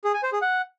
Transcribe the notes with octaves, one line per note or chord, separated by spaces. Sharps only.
G#4
G#5
C5
G#4
F#5